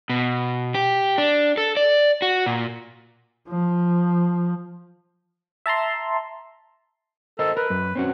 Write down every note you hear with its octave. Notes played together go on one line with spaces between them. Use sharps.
B2
G4
D4
A4
D5
F#4
A#2
F3
E5 A5 A#5 C6
A4 A#4 C5 D#5
A#4 B4
F#2
C4 C#4 F#4